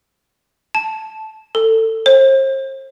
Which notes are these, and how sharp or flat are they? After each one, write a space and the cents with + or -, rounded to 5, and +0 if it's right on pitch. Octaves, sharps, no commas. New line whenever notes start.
A5 -10
A4 +25
C5 +40